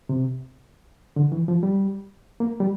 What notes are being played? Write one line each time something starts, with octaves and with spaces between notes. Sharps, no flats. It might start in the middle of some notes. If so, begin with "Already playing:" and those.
C3
D3
E3
F3
G3
A#3
G3